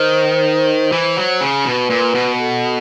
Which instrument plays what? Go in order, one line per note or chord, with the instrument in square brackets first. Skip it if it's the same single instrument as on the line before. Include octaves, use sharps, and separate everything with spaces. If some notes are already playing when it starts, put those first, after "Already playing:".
Already playing: [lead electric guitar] D#3 [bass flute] C5
[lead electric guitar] E3
F#3
C#3
[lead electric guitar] B2 [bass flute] B4
[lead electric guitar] A#2
B2
[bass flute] A4